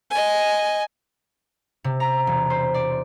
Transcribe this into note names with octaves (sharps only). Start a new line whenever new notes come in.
D#5 G#5
C3
A#5
E1
C5
D5